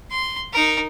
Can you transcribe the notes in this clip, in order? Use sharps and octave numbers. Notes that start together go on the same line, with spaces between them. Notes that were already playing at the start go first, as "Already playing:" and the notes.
C6
D#4 A#4